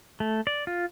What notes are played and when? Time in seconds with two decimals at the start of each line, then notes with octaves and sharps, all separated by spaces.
0.20 A3
0.47 D5
0.67 F4